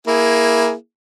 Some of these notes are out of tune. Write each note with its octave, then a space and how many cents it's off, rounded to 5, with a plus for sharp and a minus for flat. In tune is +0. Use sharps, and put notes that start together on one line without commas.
A#3 +10 E4 +0 G#4 +0